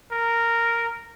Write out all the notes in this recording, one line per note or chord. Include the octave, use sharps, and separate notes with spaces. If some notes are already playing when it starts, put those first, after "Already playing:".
A#4